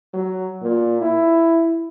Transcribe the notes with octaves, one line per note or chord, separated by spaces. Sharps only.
F#3
A#2
E4